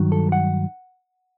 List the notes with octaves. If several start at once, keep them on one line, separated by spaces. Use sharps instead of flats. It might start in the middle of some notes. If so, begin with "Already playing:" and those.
Already playing: G2 D#3 F#3
A4
F#5